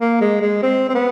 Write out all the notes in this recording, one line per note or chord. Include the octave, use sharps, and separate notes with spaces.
A#3
G#3
G#3
C4
C4
B3